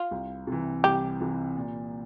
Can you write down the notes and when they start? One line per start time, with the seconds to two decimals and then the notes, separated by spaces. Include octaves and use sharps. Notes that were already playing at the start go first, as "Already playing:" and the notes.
Already playing: F4
0.11 C2
0.47 C3 E3
0.84 C2 G4
1.20 C3 E3
1.56 A#2